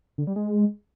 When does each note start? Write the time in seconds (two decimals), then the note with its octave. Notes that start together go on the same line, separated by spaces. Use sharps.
0.18 D3
0.27 G3
0.36 G#3